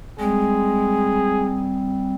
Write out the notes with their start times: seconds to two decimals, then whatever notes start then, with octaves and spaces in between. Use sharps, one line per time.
0.19 G3 G#3 C4 G#4